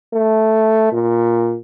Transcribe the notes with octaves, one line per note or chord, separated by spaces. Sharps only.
A3
A#2